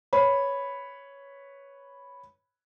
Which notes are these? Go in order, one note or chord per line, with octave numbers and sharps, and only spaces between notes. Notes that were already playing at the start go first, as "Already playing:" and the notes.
B4 C#5 B5